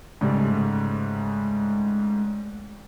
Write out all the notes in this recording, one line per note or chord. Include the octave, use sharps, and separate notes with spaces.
G#2 C#3 G3 A3